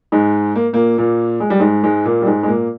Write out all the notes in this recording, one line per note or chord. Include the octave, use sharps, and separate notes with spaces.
G#2 G#3
A#3
A#2 A#3
A#2 A#3
G#3
G3
G#2 G#3
G#2 G#3
A#2 A#3
G3
G#2 G#3
G#3
A#2 A#3